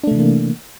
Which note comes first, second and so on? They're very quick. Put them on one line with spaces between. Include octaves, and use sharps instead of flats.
D4 A3 C3 E3 A#3